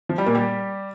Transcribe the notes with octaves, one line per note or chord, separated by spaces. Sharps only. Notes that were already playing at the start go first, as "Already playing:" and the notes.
F3
G3
A#2 A#3
G3 G4